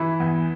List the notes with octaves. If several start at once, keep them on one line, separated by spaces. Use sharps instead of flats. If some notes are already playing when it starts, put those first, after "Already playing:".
Already playing: E3 E4
E2